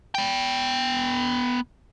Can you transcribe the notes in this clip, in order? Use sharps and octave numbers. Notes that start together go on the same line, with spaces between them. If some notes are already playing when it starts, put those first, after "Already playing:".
B3 G5